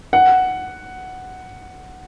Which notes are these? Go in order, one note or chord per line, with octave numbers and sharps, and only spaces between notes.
F#5